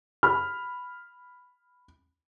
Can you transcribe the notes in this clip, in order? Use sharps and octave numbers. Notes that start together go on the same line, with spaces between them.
B5 F6